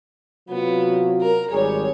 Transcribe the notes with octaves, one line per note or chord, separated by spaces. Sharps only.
C3 F#3 B3 F4
A#4
G#1 G3 G#4 C#5